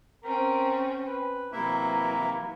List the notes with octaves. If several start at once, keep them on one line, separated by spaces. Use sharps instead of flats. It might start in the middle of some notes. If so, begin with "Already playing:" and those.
C4 C#4 A#4
B4
C3 E3 F#3 A#3 B3 E4 E5